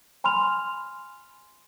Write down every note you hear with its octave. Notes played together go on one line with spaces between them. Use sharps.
G#5 B5 C6 F6 F7